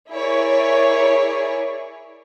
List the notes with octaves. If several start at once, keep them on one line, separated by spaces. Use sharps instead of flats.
E4 G#4 A#4 C#5 D5